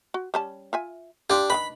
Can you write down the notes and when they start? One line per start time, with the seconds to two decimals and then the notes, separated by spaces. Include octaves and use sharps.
0.14 F#4
0.34 G3 C#4 A5
0.73 F4 E5 G#5
1.30 D4 F4 G4
1.50 D#3 D4 B4 B5